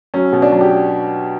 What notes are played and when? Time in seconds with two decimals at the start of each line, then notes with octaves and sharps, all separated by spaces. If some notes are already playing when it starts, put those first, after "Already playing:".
0.14 F#3 C#4
0.33 B2
0.42 D4
0.52 F#3
0.61 G4